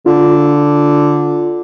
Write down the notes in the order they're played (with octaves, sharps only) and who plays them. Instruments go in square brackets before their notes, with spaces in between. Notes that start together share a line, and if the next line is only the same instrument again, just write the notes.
[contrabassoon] D3 [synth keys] F4